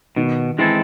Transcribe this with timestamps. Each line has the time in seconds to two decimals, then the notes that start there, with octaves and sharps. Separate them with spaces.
0.16 B2 D#3
0.58 E3 G#3 C4 E4 A4